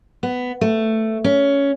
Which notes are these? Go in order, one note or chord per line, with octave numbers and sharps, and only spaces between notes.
B3
A3
C#4